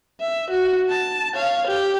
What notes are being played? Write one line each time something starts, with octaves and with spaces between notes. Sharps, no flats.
E5
F#4
A5
C#5 F5
G4